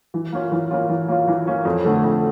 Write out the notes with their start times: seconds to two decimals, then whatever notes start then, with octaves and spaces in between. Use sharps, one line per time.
0.14 E3
0.33 A#3 C#4 F4
0.52 E3
0.71 A#3 C#4 F4
0.89 E3
1.08 A#3 C#4 F4
1.28 E3
1.46 A#3 C#4 F4
1.65 F2
1.85 D3 A3
2.04 F2